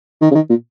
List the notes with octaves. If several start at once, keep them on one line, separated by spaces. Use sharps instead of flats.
D#3
C#3
D#3
A#2